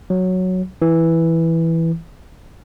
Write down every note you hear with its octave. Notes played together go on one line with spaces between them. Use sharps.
F#3
E3